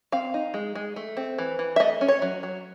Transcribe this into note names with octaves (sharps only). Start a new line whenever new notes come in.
C4 F5
D#4
G#3
G#3
A3
C4
E3
E3
E5
A3 D#5
C#4
C#5
F#3
F#3